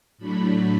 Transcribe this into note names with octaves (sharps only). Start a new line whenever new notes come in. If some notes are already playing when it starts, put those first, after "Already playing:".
A2 F#3 A3 D4 B5